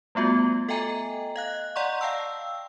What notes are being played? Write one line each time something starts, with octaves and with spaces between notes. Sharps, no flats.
G3 A3 B3 F4 F#4
A4 D#5 E5 G5 G#5 A#5
D#5 F5 F#6
D5 F#5 A#5 C6 C#6
F5 G5 A5 E6